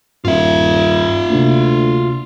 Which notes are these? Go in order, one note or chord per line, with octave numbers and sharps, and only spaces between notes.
D#1 G2 F4 E5
D2 C3 A#3